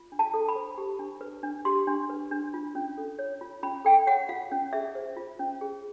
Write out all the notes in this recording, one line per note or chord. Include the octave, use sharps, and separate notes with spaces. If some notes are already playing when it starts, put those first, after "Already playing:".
Already playing: F4
D4
A5
A4
B5
C5
G4
D4
B4
D4
G4 C6
D4
B4
D4
F4
C#4
A4
C#5
F4
C#4 B5
A4 G5
C#5 F#5
F4 F5
C#4
G#4 E5
C5
F4
C#4
G#4